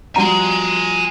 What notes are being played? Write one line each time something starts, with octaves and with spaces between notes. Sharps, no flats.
F3 G3 F#4 G#5 A#5 C6